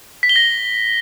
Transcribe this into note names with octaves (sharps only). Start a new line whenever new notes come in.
B6
G7
A#6